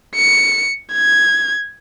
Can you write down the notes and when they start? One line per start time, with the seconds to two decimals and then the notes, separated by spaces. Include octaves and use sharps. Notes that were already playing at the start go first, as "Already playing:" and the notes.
0.16 C#7
0.93 G#6